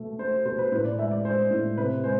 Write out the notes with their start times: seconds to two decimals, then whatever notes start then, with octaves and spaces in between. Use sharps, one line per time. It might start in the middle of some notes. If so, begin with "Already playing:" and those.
Already playing: B2 A3
0.19 A3 C5
0.45 B2 C5
0.59 B4
0.72 A2 B4
0.85 D5
0.98 G#3 E5
1.11 D5
1.25 G#3 C5
1.50 A2
1.78 C3 B4
2.04 G#3 C5